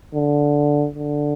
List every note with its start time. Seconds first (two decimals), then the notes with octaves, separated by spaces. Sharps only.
0.15 D3
0.95 D3